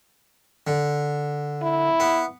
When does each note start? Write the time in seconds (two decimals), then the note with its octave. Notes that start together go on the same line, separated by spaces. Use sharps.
0.67 D3
1.63 E4
2.00 B3